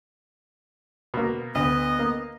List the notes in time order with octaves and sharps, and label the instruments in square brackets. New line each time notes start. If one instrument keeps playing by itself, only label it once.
[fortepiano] B2 A#3
[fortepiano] D2 [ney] B3 [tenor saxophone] D#5
[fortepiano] A#3